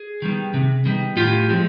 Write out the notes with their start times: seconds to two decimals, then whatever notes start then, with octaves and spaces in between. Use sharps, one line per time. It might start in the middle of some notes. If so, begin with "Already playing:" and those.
Already playing: G#4
0.22 D#3 G3 B3
0.54 C3
0.85 D#3 G3 B3
1.17 A2 F4 G4
1.49 F3 G#3 C4